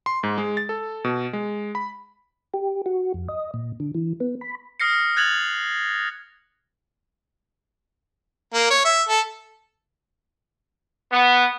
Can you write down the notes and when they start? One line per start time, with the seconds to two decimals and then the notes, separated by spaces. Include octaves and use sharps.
0.06 C6
0.23 G#2
0.38 G#3
0.57 A6
0.69 A4
1.04 B2
1.33 G#3
1.75 B5
2.54 G4
2.86 F#4
3.14 F2
3.28 D#5
3.54 A#2
3.80 D3
3.95 E3
4.20 B3
4.41 B5
4.80 D#6 F6 A#6 C7 C#7
5.16 F#6 G#6 A6 F7 F#7
8.54 A#3
8.71 C#5
8.85 E5
9.09 A4
11.12 B3